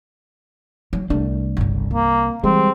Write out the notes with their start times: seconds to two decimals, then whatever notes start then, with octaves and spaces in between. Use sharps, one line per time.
0.93 F#3
1.10 C2 A3 D4
1.57 G1 C#2
1.91 C3 A#3
2.44 E3 G3 G#3 C4